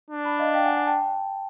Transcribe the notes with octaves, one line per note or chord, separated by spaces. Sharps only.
D4
A5 B5
D#5 F5
F5 G5
F#5 G#5
F#5 G#5
G5 A5